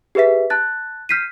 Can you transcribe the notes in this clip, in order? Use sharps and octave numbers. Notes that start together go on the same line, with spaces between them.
G4 G#4 B4 E5 B6
A5 F#6 A6
F6 G6 B6 C7 D#7